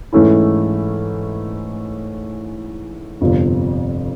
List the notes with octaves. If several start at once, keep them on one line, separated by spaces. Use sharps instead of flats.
G#2 E3 A3 C#4 E4
G1 F2 C3 F3